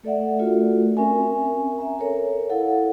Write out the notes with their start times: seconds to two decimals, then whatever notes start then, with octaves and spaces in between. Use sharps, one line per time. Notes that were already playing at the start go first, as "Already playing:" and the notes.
0.04 A3 A4 D5 E5 F#5
0.39 A3 D4 F4 F#4 A4 A#4
0.97 C4 C#4 A#4 E5 G#5
1.78 E5 A#5
1.99 A4 A#4 C#5
2.50 E4 A4 F5 F#5